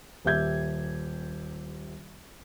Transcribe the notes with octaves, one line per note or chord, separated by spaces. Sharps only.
D#1 G4 E5 G6 G#6